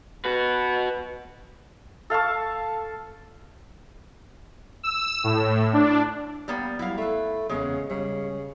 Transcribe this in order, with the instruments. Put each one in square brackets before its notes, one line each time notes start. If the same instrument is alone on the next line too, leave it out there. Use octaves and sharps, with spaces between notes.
[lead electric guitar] F#4 B4
[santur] A4 F5 A5 C#6
[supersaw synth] E6
A2
D4
[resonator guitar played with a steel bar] G3 A#3 B3
[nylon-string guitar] F#3 G3 [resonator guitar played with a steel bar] E4 F5
[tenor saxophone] A3 [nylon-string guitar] B4 E5
[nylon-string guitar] E2 B3 C#4 [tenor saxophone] C#3 [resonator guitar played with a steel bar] G#3
[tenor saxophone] C#3 [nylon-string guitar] G3